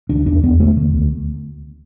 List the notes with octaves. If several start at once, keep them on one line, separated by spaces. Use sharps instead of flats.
D2 D4
E2 D4
E2 B3
D3 A3
D3
D2